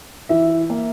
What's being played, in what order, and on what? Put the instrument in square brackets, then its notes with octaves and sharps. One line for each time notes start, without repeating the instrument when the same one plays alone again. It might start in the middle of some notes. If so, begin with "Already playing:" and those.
[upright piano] E3 E5
A#3